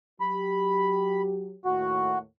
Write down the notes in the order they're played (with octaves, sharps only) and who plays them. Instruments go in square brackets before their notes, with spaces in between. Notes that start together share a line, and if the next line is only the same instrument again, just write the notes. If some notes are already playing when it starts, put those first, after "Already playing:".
[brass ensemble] F#3 G4 [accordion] B5
[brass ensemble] D#2 A2 [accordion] F#4